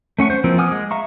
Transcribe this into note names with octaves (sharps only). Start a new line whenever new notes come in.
A3 C#4 F#5 C#6
C5
E3 F3 A#3 C4
F#5 G#5 D6 D#6 F6
G#3
E5 F5 A#5 C#6